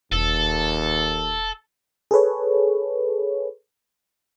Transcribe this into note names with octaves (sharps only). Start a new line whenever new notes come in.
E1 D#2 A4
G#4 A4 B4 C#5